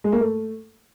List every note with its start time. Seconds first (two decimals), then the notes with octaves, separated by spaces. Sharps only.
0.04 G#3
0.12 A#3
0.21 A3